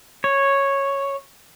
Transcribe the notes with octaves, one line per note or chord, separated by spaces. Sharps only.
C#5